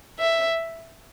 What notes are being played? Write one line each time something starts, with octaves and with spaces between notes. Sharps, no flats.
E5